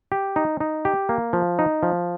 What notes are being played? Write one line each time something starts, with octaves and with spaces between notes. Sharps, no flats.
G4
D#4
D#4
G4
A#3
F3
D#4
F3